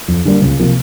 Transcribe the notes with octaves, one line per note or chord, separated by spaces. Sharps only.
F2
D3 G3 A#3
C#2
C3 F3 A#3